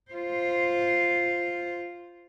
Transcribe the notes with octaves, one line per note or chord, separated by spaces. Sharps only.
F4 C5